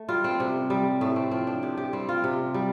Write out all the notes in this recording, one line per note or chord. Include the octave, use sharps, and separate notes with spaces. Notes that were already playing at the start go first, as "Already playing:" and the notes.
Already playing: A3
G3 F4
C4
C3
G3
A2 A3
C4
F3 C4
D4
C3 G4
G4
G3 C4
F4
C3
G3